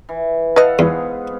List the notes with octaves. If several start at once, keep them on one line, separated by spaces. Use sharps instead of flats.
E3
A4 B4 D#5 F5 F#5
E2 G#2 B3 G#4